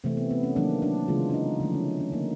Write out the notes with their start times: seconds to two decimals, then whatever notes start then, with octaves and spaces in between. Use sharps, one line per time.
0.04 C3 E3 A3 C4
0.17 B3
0.31 B3
0.43 C#4
0.56 D#3 F#3 A#3 D4
0.82 D4
1.08 C#3 E3 G#3 F4
1.30 D4
1.34 D#4
1.60 D3 F3 A3 D4
1.74 C#4
2.00 C#4
2.12 D3 F#3 A#3 D#4